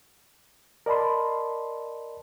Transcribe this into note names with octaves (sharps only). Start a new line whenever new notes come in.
A#4 D5 D#5 A5 B5 C6